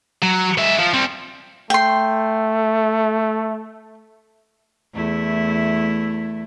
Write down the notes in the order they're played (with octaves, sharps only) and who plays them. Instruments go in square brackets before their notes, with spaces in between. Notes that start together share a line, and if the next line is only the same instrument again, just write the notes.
[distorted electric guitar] F#3
G#3 E5
F3
G3 C4
[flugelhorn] A3 [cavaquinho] G5 C6
[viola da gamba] E2 A3 E4